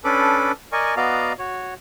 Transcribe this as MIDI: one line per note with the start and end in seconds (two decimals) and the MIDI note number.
0.04 0.52 61
0.04 0.52 62
0.04 0.52 69
0.04 0.52 71
0.04 0.52 83
0.04 0.52 86
0.72 0.95 70
0.72 0.95 74
0.72 0.95 75
0.72 0.95 80
0.72 0.95 85
0.97 1.33 59
0.97 1.33 66
0.97 1.33 74
0.97 1.33 75
0.97 1.33 77
0.97 1.33 82
1.39 1.74 66
1.39 1.74 73